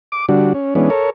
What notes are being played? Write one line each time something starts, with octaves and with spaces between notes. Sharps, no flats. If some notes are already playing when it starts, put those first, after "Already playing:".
D6
D3 G3 D4 F#4
C#4
E3 G#3 B3 C#4 D4
A4 A#4 C#5